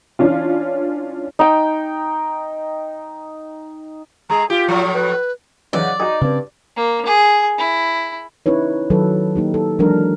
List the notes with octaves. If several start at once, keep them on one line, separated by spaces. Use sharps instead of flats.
E3 C#4 D4 F4
D#4 G5
G#3 G#4 A#5
F4 G4
A2 F3 F#3
B4
F#2 C#3 E3 D#4 D5 F#5
D#4 F#4 G#4
G2 C#3 C4
A#3
G#4
E4
C#4 D#4 E4 B4 C#5
D#3 F#3 A4 B4
A#3 D#4 G4
A4
E3 F#3 G#3 D4 A#4